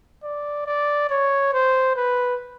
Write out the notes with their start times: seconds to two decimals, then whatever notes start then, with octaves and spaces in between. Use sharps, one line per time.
0.24 D5
0.66 D5
1.10 C#5
1.54 C5
1.96 B4